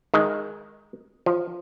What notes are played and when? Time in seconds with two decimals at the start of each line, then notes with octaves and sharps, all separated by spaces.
0.14 D#3 G#3
1.26 F3